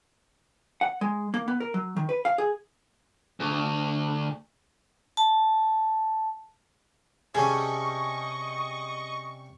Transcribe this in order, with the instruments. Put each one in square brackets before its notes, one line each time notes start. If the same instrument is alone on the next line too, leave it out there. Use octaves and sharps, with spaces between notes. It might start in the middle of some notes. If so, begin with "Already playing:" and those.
[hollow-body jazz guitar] F#5
G#3
A#3
B3
A#4
F#3
D#3
B4
F5
G#4
[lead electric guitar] D2
[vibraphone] A5
[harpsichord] C3 G3 C#4 [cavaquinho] G#4 A4 [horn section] D#5 [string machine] C#6